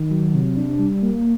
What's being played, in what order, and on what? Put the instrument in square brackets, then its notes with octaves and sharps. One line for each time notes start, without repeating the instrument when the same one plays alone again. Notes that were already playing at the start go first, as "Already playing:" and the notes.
Already playing: [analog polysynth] D#3
F#3
C3
D4
G3
A#3